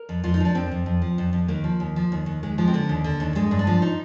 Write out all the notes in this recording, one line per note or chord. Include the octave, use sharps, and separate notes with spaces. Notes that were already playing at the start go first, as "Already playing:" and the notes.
Already playing: A#4
F2
F2 F4
D#4
F3 D4
F2 C4
F2
F2
F3
F2
F2
D#2 A#3
F3
D#2
F3
D#2
D#2
D#2 G#3
F3 G#3
C4
D3 A#3
D#2
D3
D#2
G2 G#3
G2
D4
F3
D#4